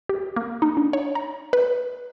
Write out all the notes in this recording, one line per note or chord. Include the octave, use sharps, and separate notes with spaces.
G4
A#3
D#4
D4
C#5
A#5
B4